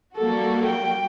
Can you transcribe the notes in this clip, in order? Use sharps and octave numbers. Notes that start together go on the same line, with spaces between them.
G3 A#3 F#4 A4
G5